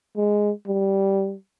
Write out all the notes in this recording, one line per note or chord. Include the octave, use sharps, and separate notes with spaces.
G#3
G3